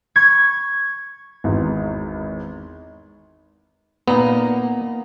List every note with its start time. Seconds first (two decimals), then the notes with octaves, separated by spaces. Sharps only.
0.16 B5 C#6 G#6
1.44 G#1 E2
4.08 A#2 A#3 B3 D#4 A#5